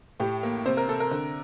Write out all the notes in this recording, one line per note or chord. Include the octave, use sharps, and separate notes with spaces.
A2 G4
A#3
C3 C5
A#4
C3 A4
A#4
D3